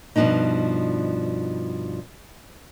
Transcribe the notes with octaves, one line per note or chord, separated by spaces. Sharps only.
G2 B2 D3 F3 D4 D#4